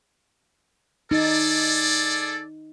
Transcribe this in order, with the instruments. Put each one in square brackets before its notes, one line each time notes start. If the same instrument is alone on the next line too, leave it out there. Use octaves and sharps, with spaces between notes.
[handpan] D#4 [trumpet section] G#4 A4 D5